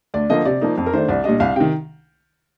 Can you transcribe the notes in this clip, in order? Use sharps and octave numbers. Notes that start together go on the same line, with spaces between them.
D2 D5
D3 F3 A#3 D#5
C3 D5
F3 A#3 D#4
F2
A#4
D#3 A3 D4 C5
C2 D5
A#2 G3 D4 D#5
C2 F5
C3 D#3 G5